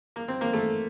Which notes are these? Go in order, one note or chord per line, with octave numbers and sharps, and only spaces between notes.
A#3
C4
A#3
A3